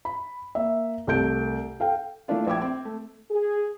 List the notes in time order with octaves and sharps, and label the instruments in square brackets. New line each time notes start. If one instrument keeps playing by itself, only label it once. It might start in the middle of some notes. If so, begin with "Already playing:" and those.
[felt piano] B5
A#3 E5
C2 A3 G6 D7
A4 F5 G5
E3 A3 A#3 D4 F4
A#1 E5 G5 D6 G#6
C4
A3
[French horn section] G#4